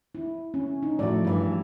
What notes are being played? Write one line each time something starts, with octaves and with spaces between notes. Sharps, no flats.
E4
C#4
D#4
A2 F3 A3 F#4 D5
G2 E3 G3